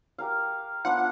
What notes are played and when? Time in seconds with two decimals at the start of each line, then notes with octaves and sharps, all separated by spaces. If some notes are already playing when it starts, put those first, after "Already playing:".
0.18 G4 A#4 F5
0.85 B3 D4 F4 F#5